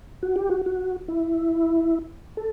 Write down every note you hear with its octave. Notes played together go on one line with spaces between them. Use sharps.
F#4
G4
F#4
F#4
E4
A4